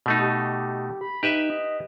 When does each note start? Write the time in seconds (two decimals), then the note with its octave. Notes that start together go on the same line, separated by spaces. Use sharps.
0.06 B2 A3 D#4
0.19 G4
1.01 B5
1.23 D#4 G4 B4 E5
1.50 D#5